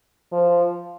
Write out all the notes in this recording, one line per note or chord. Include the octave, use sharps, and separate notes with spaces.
F3